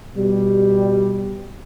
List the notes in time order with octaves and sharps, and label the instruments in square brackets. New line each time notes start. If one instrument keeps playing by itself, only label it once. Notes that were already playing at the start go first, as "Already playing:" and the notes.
[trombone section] B2 G3